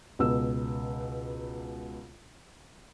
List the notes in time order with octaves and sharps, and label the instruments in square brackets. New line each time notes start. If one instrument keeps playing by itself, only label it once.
[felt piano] C#2 B2 E6